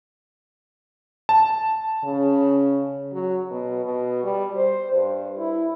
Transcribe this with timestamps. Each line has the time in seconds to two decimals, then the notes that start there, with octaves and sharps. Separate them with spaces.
1.29 A5
2.04 C#3
3.12 F#3
3.51 B2
3.85 B2
4.23 G3
4.56 C5
4.92 G2
5.39 E4